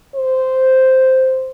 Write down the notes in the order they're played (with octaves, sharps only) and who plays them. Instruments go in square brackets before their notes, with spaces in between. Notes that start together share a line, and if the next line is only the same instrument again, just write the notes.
[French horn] C5